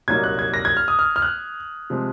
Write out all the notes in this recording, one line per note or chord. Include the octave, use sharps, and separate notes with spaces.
C2 A#2 F#3 A#3 D#4 G#6
F#6
G#6
A#6
G#6
F6
D#6
F6
F6
F#6
C3 F3 G#3